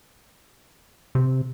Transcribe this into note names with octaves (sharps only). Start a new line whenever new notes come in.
C3